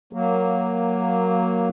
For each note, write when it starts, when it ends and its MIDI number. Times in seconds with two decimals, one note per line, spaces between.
0.13 1.69 54
0.13 1.69 58